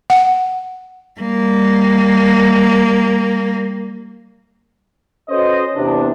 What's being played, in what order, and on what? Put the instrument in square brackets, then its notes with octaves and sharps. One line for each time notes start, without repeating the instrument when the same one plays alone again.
[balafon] F#5
[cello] G3 A#3
[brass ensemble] C#4 F#4 A4 B4 C5 D#5
E2 C3 D4